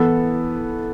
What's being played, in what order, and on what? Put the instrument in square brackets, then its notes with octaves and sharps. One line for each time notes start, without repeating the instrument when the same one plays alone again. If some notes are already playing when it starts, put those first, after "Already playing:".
Already playing: [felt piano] E3 B3 E4 A4